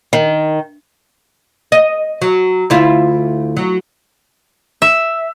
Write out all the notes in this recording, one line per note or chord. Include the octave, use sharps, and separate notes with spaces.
D#3
D#5
F#3
D2 E4 F4
F#3
E5